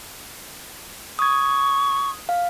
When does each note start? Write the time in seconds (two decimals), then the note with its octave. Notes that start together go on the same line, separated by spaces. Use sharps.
1.19 C#6 D#6 G#6
2.29 F5